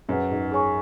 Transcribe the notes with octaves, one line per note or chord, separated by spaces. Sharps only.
F#2 G#4 B4 F#5
G#2
G#4 C#5 G#5 C#6